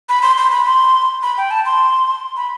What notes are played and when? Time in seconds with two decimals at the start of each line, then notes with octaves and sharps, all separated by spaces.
0.09 B5
0.22 C6
0.38 C6
0.52 B5
0.66 C6
1.23 B5
1.37 G5
1.51 A5
1.66 C6
2.37 B5